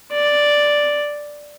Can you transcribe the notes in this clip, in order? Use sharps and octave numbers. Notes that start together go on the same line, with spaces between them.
D5